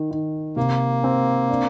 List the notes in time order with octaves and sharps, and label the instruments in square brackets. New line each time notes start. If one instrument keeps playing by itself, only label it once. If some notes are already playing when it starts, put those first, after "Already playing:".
Already playing: [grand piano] D#3
D#3
[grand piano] C3 [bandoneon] A#3
[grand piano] C4
D4